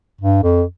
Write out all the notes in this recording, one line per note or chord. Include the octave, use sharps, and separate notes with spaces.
G2
F2